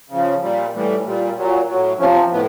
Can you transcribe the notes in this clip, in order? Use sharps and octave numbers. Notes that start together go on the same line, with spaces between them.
C#3 F3
A#2 G3
A2 E3 G3
A#2 G3
A#2 F#3
A2 F#3
C3 F3 C#4
C4
A2 B3